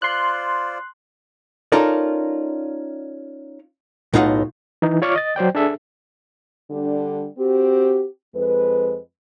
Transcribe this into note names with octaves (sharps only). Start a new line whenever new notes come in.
F4 C5 D5 C6 F#6
C#4 D#4 F4 A4 A#4 D5
B1 A2 D#4 F4 D#5 F#5
E3 D#4
F4 C#5 D5 C#6 D6 F6
D#5 A6
F#3 C5 D5 G5
D4 G#4 A4 E5
D3 G3 D4
C4 F#4 G4
F2 G#3 B4